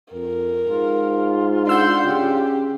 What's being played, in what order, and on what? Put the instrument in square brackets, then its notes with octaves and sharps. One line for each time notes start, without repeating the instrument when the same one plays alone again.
[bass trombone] F2 [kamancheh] A#4
[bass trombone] G#2 [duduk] F4
[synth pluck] D4 E6 G6 [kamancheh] F#5 C6
[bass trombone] C#3 [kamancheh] G4